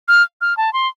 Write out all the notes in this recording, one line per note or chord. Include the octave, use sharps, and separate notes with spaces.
F6
F6
A5
C6